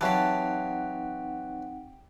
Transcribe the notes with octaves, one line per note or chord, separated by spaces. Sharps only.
E3 F#3 C4 D#4 G4 F5 F#5 A5